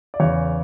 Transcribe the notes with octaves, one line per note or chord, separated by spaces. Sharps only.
D5
E2 C#3 E3 C#5